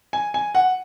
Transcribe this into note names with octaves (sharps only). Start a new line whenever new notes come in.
G#5
G#5
F#5